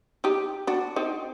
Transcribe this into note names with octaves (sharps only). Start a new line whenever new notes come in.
D#4 G4
D4 F#4
C4 D#4